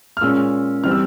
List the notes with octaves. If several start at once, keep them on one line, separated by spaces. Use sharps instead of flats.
F6
A#2 G#3 C#4 E6
E3 G3 C4 F6
E6